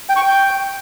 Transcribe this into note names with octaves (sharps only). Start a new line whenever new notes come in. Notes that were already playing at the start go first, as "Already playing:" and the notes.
G5
C#6
G5